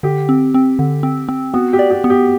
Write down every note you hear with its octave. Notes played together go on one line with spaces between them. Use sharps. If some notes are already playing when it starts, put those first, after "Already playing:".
D3 G4
C4
C4
D3
C4
C4
B3 F#4
G4
D5
G4
B3
G4